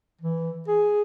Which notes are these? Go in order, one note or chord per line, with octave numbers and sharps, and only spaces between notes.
E3
G#4